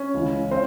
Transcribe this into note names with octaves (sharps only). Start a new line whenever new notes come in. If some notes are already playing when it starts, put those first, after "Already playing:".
Already playing: C#4
C#2 C#3 E3
C4 C5